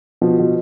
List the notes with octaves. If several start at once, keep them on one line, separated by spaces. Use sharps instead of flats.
B2 F3
B2